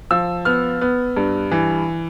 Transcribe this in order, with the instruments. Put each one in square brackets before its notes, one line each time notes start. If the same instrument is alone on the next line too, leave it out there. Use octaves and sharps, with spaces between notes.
[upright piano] F3 E6
B3 F6
B3
G2
E3